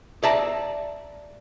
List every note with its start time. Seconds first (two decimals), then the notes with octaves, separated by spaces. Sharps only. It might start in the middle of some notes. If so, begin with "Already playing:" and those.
0.24 D5 E5 A5 A#5